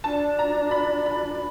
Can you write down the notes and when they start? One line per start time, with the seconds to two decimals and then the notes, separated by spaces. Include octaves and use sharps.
0.04 D4 A5
0.39 A#5
0.71 B5
1.06 B5